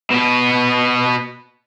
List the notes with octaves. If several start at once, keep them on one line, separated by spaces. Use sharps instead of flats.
B2 B3